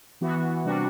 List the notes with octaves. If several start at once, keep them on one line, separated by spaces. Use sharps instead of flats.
E3 B3 F#4
C3 G3 D4 F#4